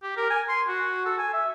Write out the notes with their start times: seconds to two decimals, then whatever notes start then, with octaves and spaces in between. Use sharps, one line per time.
0.03 G4
0.17 A#4
0.30 G#5
0.49 C6
0.68 F#4
1.05 A4
1.18 G#5
1.33 E5